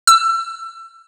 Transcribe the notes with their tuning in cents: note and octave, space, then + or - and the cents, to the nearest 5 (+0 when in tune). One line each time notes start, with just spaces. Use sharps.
E6 +25